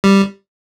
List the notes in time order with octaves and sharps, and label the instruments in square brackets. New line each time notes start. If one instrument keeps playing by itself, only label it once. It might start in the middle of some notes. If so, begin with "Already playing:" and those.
[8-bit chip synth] G3